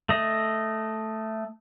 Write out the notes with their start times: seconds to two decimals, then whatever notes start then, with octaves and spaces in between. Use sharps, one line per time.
0.09 A3 D#5